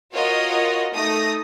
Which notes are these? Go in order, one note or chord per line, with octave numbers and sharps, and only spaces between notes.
F4 F#4 A#4 C#5 D#5
A3 D#4 D#6 A#6